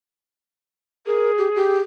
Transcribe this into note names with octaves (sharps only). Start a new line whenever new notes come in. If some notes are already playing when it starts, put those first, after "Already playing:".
G#4 A#4
G4
G4